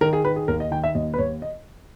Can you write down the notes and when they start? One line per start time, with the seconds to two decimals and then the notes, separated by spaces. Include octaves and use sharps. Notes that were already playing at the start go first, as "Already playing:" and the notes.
0.01 D#3 A#4
0.13 G#4
0.24 D#3 B4
0.36 G#4
0.48 D#2 A#4
0.60 D#5
0.71 D#3 G5
0.84 E5
0.95 D#2 D#5
1.14 B4
1.18 D#2 C#5
1.42 D#5